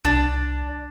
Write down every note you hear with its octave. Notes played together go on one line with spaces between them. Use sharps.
C2 D4